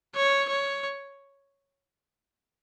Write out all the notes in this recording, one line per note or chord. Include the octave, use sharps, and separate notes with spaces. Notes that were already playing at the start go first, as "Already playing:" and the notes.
C#5
C#5